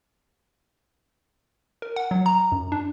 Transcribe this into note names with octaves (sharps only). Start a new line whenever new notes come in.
A#4
F#5
F#3
A#5
F#2
D4